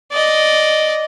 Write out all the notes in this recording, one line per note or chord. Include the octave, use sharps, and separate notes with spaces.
D5 D#5